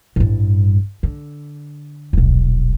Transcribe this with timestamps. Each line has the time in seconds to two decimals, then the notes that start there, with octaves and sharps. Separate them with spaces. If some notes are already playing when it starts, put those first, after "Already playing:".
0.16 A1 G2
1.03 D3
2.13 D#1 B1